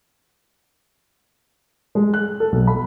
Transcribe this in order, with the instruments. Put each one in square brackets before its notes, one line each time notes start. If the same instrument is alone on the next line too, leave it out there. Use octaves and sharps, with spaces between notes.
[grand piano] G#3
F#6
A4
B1
B5